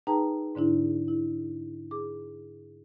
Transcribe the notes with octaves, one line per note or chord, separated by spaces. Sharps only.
D#4 G#4 B4 G5 A5 A#5
G#2 D3 D4 E4
E4
G#4 D6